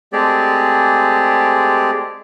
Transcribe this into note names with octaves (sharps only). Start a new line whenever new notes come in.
G#3 A3 C4 G4 G#4 D5